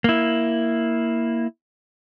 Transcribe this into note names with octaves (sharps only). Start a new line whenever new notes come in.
A#3 E4